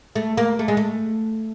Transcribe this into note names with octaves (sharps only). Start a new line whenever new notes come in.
A3
A#3
A3
G#3
A3